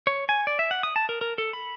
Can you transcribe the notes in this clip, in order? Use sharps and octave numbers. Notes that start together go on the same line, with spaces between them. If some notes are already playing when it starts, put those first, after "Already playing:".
C#5
G#5
D5
E5
F#5
D#6
A5
A#4
A#4
A4
B5